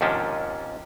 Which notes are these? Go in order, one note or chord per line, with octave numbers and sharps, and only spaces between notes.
D#2 G#2 C3 F3 C#4 D4